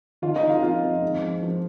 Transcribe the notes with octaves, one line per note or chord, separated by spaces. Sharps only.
D#3 F4 F5
D#4 D#5
D#3
F4 F5
F2 F4 F5
F2
G#2
F3
F3